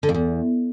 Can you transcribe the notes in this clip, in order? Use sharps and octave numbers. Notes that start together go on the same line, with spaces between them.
D3
F2
E2